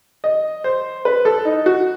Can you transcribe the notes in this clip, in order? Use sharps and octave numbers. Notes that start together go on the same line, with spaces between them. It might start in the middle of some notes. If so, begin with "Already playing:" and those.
D#5
C5
B4
A4
D#4
F#4